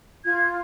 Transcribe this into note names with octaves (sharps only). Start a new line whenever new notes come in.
F4 G#6